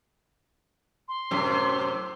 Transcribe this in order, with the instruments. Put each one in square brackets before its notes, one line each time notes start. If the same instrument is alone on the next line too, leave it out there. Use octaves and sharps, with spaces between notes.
[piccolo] C6
[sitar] F#2 A2 C3